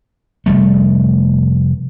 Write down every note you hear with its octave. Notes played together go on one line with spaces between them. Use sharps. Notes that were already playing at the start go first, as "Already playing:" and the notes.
F1 G3 A3